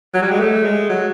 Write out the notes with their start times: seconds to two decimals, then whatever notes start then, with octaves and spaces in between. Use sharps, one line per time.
0.14 F#3
0.22 G3
0.31 G#3
0.40 A3
0.65 G#3
0.89 F#3